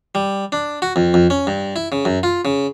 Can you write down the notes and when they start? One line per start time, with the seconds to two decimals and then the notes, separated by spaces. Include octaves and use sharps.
0.15 G3
0.52 D4
0.82 F#4
0.96 F2
1.14 F2
1.30 C#4
1.47 G2
1.76 E4
1.92 C#3
2.05 F#2
2.23 F4
2.45 C#3